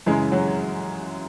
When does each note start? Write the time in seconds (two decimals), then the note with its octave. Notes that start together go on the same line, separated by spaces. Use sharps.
0.06 F#2 C#3 E3 G#3
0.32 F#3